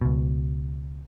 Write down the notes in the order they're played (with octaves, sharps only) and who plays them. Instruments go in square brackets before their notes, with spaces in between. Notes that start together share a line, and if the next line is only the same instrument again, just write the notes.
[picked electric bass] C#2 B2